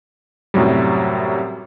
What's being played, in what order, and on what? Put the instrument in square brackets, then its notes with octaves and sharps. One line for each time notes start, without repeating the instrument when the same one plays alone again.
[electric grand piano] F#2 A2 C3 F#3 G3